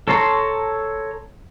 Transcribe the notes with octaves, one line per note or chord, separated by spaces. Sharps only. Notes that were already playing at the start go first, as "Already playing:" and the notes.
A4 C#5 A#5 C6